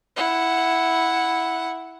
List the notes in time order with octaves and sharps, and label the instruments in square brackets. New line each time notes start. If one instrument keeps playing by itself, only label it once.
[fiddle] E4 F#5